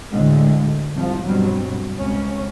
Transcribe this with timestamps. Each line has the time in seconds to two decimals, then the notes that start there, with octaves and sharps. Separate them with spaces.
0.11 D2 A2 D3 G#3
0.93 C2 G#2 F3
1.24 G2 B2 F#3 G3 C4
1.97 C#2 C3 C#4